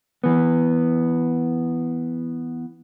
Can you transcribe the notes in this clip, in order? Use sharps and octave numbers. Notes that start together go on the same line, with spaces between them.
E3 B3